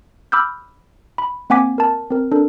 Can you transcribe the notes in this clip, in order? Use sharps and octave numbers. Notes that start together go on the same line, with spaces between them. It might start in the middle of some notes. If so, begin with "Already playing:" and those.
B5 D6 E6 F6 G6
B5
A#3 C4 F#5 G#5 D6 B6
A#4 A5
C4 A#4
D4 A4 A#4